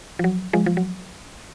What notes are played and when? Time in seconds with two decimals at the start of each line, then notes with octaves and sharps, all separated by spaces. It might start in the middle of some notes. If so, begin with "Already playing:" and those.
0.19 F3
0.24 F#3
0.53 F3 G#3
0.66 F3
0.77 F#3